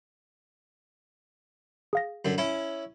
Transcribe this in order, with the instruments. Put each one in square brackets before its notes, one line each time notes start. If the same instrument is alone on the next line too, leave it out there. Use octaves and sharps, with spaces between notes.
[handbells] G#4 F5 A#6
[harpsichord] F#2 D3
C#4 E4